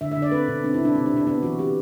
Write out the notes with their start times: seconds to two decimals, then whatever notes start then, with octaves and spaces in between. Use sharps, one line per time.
0.01 D3 E5
0.12 E5
0.17 D3
0.22 D5
0.32 C4 B4
0.48 B2 D4
0.64 C4 D4
0.74 E4
0.80 C3
0.85 D4
0.95 B2 C4
1.06 D4
1.12 B2
1.17 D4
1.27 B3 D4
1.43 E3 F#4
1.59 B3 G4